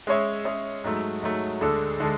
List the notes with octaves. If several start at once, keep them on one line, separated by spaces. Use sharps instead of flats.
G#3 C#4 G#4 C#5 E5
G#3 C#4 G#4 C#5 E5
G#2 F#3 A3
G#2 F#3 A3
D2 D3 G#3 D4 A4
D3 G#3 D4 A4